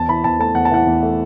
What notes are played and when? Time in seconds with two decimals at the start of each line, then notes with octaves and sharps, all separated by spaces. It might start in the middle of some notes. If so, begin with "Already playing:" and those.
Already playing: E2 A5
0.08 E3 B5
0.24 E2 A5
0.39 A3 A5
0.55 E2 F#5
0.65 A5
0.71 E3 F#5
0.87 E2
1.03 A3